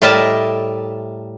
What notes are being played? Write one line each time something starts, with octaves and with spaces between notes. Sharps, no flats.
A2 G3 A#4 D#5 E5 A5